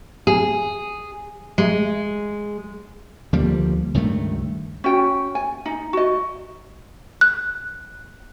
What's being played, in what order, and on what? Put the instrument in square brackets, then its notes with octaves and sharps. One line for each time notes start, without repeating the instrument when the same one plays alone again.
[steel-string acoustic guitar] G#4
G#3
[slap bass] D2 F3 G3 A#3
C#2 G2 D#3 A3
[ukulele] C#4 F#4 G5
G#5
D#4
F#4 D#5
[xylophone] F#6